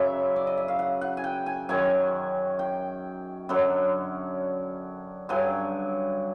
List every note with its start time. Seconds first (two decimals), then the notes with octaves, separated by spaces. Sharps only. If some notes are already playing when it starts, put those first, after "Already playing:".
Already playing: F#2 C#3 F#3 E5
0.36 D5
0.47 D#5
0.57 E5
0.68 F5
0.79 F#5
1.01 F#5
1.17 G#5
1.24 G5
1.46 G#5
1.69 F#2 D#3 F#3 G#5
2.59 G5
3.49 F#2 D3 F#3
5.29 G2 D3 F#3 G#5